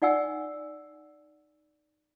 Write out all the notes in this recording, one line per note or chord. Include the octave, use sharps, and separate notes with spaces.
D#4 D5 F#5 G#5 E6